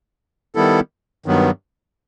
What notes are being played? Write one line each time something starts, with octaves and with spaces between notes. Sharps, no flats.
D#3 G3 B3 E4 A4
G2 D#3 F#3 B3